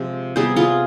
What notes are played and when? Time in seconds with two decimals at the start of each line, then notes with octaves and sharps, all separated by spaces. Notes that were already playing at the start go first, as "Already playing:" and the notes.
Already playing: C3 F3 G#3
0.36 C3 G3 B3 G#4 C5
0.56 F4 G#4